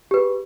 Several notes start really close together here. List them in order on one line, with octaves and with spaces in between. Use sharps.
G4 B4 G#4